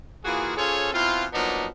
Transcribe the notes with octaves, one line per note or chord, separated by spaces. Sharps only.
E3 A#3 F4 F#4 G#4
C#4 F4 G#4 A4 C5 C#5
B2 C4 E4 F4
F3 F#3 A#3 B3 D4 D#4